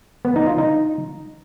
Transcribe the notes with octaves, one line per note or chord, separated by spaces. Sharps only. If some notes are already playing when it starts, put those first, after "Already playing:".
B3
D#4
F4
D#4